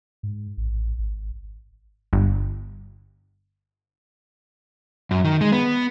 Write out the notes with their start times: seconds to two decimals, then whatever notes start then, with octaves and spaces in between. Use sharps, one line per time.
0.23 G#2
0.57 A1
0.98 G#1
2.13 G1
5.11 F#2
5.25 D#3
5.41 G#3
5.52 B3